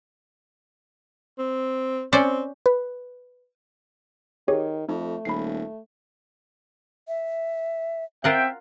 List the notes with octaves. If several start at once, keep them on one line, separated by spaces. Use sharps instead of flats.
C4
C4 C#4 C5 D5
B4
D#3 G4 G#4 C#5
F2 A3 D#4
D#1 B5 C7
E5
C4 F4 A#4 E5 F#5 G5